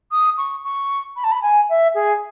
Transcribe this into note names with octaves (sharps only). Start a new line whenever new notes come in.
D#6
C#6
C#6
B5
A5
B5
G#5
E5
G#4